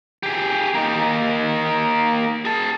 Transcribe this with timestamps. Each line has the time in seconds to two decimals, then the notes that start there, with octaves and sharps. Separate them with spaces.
0.23 G4 G#4
0.74 A#3 D#4
2.45 G#4 A5